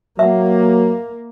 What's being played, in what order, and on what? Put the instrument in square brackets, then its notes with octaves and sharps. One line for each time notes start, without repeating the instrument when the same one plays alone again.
[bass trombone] F#3 [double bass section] A#3 [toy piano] E5 F#5